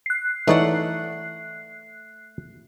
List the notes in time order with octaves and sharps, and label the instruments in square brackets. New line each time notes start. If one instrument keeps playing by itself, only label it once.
[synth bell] F#6 C7
[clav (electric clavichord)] E3 D#4 C#5 [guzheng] A3 D5 F#5